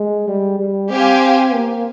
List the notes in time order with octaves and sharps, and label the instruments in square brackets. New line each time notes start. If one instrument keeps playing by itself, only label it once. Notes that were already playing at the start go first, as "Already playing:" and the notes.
Already playing: [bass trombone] G#3
G3
G3
[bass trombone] C4 [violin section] G4 C5 F5 G#5
[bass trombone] A#3